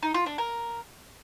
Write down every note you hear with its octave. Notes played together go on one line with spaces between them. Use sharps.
D#4
F4
D4
A#4